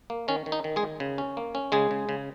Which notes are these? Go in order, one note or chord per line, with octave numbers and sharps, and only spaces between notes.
A#3
D#3 C#4
D#3
D#4
D#3
G#3 G#4
D#3
C#3
C#4
A#3
C#4
C#3 G#3 G#4
C#3
C#3